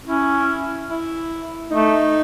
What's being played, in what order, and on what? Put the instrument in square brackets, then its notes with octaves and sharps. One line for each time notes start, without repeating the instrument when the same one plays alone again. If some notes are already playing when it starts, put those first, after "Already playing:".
[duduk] C#4 [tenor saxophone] E4
[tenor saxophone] E4
[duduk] A3 [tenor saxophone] D#4